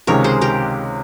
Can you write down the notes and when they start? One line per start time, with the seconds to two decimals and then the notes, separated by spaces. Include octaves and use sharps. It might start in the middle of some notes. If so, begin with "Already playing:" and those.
0.07 C#2 C3 D#3 G#3 C#4 A#4 C#5
0.24 G#4 C5
0.41 G4 A#4